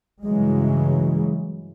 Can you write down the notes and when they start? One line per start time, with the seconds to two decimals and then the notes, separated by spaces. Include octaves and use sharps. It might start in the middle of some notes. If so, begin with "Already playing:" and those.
0.24 G2 C#3 E3 F#3 G#3